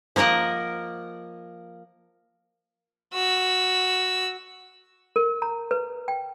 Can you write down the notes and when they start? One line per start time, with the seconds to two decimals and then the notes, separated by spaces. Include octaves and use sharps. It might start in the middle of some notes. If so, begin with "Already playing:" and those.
0.16 F3 A#3 A#4 D#5 F#5
3.14 F#4 E6
5.16 A#4
5.42 A#5
5.71 B4
6.08 G5